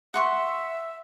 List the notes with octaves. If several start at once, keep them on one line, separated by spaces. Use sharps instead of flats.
E5 F#5 C6 C#6